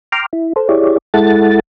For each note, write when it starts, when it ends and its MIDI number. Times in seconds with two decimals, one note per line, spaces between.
0.12 0.26 79
0.12 0.26 82
0.12 0.26 84
0.12 0.26 86
0.12 0.26 89
0.33 0.53 64
0.56 0.68 69
0.56 0.68 72
0.69 0.98 64
0.69 0.98 67
0.69 0.98 68
0.69 0.98 73
0.69 0.98 74
1.14 1.60 56
1.14 1.60 64
1.14 1.60 69
1.14 1.60 78
1.14 1.60 93